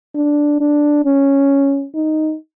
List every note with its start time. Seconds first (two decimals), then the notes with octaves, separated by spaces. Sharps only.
0.15 D4
0.61 D4
1.05 C#4
1.95 D#4